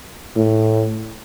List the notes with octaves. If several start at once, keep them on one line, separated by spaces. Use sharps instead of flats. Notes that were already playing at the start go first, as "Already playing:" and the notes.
A2